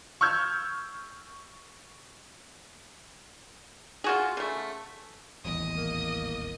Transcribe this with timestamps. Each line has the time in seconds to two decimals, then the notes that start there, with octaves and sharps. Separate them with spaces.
0.21 C#6 E6 F6 G6 G#6
4.04 F4 F#4 G#4
4.37 C#3 A3
5.45 D#1 A1 E2 D#5 D#6
5.77 A#3